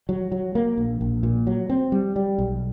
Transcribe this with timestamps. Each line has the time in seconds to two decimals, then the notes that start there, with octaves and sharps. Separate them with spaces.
0.09 F#3
0.32 F#3
0.55 A#3
0.78 A#1
1.01 A#1
1.23 A#2
1.47 F#3
1.70 C4
1.92 G3
2.16 G3
2.38 B1